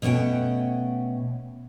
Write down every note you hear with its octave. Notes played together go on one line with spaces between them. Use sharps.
B2 A3 C#4 F#5 G5